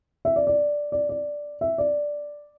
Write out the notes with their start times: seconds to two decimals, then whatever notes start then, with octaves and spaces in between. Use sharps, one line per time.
0.25 E5
0.36 D5
0.47 D5
0.92 D5
1.09 D5
1.61 E5
1.78 D5